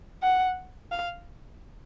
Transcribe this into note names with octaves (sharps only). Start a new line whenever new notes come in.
F#5
F5